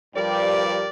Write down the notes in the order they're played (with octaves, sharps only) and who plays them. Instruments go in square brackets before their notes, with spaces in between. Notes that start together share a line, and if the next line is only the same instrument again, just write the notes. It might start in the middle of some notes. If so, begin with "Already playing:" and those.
[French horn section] G2 F3 G3 [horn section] G4 A#4 D5